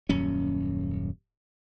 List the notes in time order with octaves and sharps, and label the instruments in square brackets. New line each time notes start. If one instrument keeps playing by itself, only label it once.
[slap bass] D#1 F#2 C#4